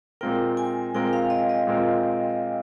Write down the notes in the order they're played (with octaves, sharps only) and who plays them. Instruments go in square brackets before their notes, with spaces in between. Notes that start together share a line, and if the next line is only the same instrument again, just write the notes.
[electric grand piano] A#2 G#3 C4 F4 A#4 [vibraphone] G5
[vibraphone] G#5
[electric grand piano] A#2 G#3 C4 F4 A#4 [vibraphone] G5
[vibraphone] F5
D#5
D#5
[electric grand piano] A#2 G#3 C4 F4 A#4